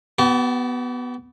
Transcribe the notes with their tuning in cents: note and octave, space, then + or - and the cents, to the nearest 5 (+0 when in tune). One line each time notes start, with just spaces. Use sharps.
B3 +0 G4 -45 A5 +0